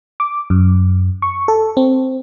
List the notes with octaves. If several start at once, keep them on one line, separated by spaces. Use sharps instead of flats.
D6
F#2
C#6
A4
C4